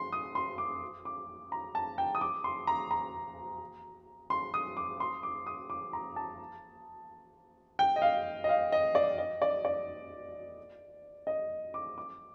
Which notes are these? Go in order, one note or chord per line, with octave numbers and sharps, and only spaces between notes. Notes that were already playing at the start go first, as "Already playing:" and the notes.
Already playing: C6
D#6
C6
D6
D6
A#5
A5
G5
D#6
D6
C6
A#5
A#5
C6
D#6
D6
C6
D6
D#6
D6
A#5
A5
G5
D#5
F5
D#5
F5
D#5
D5
D#5
D5
D5
D#5
D6
D6